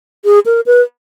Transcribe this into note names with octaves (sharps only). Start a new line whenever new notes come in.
G#4
A#4
B4